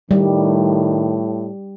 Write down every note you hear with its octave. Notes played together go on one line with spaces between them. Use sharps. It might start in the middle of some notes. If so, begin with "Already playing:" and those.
A2 D#3 G3